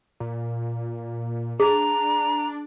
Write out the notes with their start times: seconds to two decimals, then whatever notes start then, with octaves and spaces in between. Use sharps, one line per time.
0.20 A#2
1.60 D4 G#4 A#5